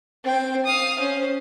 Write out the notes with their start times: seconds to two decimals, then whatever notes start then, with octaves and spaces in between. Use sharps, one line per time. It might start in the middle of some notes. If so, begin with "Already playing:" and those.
0.24 C4 G5
0.66 F5 D#6
0.99 C#4 C5